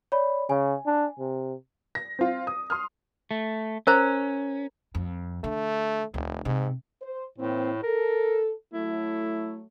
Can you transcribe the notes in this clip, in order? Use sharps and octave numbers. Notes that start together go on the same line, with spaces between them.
C#5 D5 B5
C#3 G#5
D4
C3
A#6
C4 F4
D#6
C6 D#6 F6
A3
C#4 A#4 C5 A#5
F2
D3 A3
F1 D2
G#2 C3
C5
A2 E3 A#3 C4
A4 A#4
F#3 A3 E4